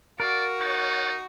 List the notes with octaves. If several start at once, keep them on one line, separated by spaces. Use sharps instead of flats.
F#4 A#4 D5 F5
D#4 C#5 F#5 A6